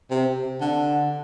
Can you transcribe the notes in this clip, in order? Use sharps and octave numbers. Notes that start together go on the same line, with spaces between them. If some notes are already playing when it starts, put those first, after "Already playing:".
C3
D3